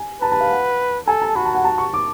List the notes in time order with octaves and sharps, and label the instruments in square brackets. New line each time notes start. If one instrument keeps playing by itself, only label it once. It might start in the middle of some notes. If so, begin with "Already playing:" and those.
Already playing: [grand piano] G#5
[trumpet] B4 [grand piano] A5
[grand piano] A5
F5
F#5
[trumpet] A4 [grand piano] G#5
[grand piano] A5
[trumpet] F#4 [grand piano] B5
[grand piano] A5
F#5
A5
C#6
D6